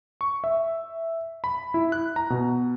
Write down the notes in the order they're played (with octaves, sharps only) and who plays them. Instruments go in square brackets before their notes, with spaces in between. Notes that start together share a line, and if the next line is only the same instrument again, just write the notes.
[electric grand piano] C#6
E5
B5
E4
F#6
A#5
B2